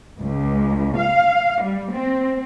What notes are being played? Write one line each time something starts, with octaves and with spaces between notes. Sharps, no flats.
C#2
F5
G3
C4